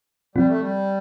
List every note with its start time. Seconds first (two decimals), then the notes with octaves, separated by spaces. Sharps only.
0.36 C3 F3 G3 C4 F4
0.48 A3
0.61 G3